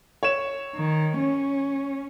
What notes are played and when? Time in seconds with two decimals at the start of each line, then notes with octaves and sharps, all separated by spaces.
0.23 C#5 E7
0.75 D#3
1.18 C#4